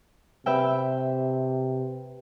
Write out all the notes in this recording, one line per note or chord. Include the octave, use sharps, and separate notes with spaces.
C3 B4 E5 G5